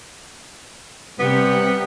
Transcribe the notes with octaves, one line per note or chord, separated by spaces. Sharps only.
C3 G3 B3 G4